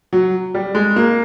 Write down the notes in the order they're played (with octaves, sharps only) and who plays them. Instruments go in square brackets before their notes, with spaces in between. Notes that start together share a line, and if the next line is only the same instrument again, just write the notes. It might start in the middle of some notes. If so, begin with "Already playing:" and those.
[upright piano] F#3
G3
G#3
A#3